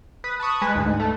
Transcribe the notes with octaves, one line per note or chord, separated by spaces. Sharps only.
B4 D#6
A5 B5 C#6 D#6
G#3 B4
D2 G#2
A3